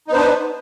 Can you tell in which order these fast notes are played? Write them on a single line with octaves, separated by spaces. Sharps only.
D#4 B3 C5 D4 B4